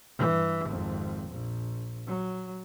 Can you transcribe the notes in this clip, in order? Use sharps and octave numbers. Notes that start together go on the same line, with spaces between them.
G2 E3
G#1 F2
A#1
F#3